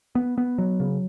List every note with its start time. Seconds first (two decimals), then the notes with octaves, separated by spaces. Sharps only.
0.15 B3
0.38 B3
0.58 F#3
0.80 C#3